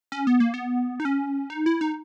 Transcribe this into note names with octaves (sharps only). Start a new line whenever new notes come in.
C#4
B3
A#3
B3
D#4
C#4
D#4
E4
D#4